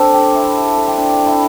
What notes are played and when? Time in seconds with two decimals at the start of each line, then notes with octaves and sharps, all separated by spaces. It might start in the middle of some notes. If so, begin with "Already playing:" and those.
Already playing: C4 D4 A4
0.14 G4
0.35 E4
0.56 G4
0.66 A4
0.77 A4
0.88 G4
0.98 D4
1.13 D4
1.26 E4